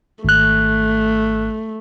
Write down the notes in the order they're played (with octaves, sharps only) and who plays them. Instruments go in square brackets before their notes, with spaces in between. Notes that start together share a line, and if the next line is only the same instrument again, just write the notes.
[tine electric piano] G#1 F#6 [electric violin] A3